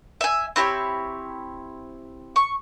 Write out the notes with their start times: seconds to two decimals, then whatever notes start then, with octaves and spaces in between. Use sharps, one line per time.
0.21 E5 G#5
0.56 C4 E4 G4 C#5
2.36 C#6